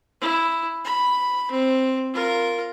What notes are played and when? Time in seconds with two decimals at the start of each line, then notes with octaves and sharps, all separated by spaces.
0.21 E4
0.85 B5
1.51 C4
2.14 F4 A#4